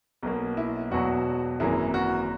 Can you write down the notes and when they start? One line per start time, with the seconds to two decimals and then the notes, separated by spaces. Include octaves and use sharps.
0.23 B1 B2 A#3
0.57 E4
0.91 E1 E2 B2 F#3 F#4
1.60 G#1 F#2 E3 A#3 E4 G#4
1.94 F#4